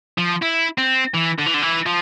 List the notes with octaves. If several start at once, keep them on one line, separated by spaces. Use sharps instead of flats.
F3
E4
C4
E3
D3
E3
D3
E3
F3